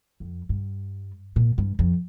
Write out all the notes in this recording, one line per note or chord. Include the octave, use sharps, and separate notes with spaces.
F2
G2
A#2
G2
F2